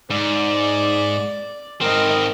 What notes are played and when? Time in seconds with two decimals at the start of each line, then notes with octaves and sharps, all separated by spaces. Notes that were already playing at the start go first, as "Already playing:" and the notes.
0.10 G#2 D5
1.81 G#2 C4 A#4 D#5